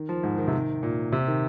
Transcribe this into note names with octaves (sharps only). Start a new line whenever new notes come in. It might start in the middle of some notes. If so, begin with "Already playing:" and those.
Already playing: D#3
F3
G#2
D#3
C3
D#3
A#2
C3
D#3